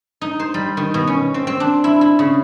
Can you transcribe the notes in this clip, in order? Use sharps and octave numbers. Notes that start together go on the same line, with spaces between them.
D#4
C5
G3
D#3
B2
C#4
C4
C4
D4
E4
E4
C#3